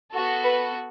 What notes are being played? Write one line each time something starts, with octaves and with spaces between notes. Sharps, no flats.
B3 F#4 A4
B4